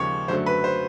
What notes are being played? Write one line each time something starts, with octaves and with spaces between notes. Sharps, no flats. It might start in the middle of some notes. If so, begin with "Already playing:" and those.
Already playing: D#2 C#3 F3 G#3 C#5
F#2 D3 F#3 A3 C5
B4
C5